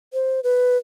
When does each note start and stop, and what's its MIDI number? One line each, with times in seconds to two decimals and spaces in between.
0.13 0.40 72
0.44 0.77 71